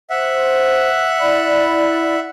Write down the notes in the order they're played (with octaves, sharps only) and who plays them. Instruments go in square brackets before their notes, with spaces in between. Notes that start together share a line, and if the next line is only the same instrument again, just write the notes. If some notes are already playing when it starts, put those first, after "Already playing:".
[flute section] C5 [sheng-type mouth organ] E5 F#5
[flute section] E4 D5 B5